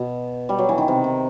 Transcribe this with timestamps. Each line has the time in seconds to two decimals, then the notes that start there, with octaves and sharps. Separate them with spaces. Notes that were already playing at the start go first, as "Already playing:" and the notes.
Already playing: B2
0.49 G3
0.58 F#3
0.69 E3
0.78 D#3
0.88 C3
1.04 D#3